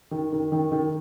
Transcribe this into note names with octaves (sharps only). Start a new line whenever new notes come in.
D#3
D#3
D#3
D#3